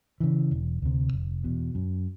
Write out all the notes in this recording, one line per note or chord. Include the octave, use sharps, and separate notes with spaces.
C#3 E3
E1
D2 C3
F1
E2 B2
F#2